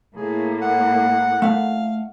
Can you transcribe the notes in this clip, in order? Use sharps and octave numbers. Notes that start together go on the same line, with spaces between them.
A2 A#3 G#4
F#5
A3 F5 F#5